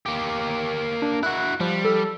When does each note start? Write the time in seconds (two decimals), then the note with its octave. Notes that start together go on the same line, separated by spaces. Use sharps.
0.06 A#3 G4
1.02 D4
1.23 E4 F#4 F#6
1.60 F3 G3
1.85 A4